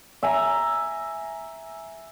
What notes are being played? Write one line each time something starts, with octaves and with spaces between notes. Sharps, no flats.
E5 G#5 A#5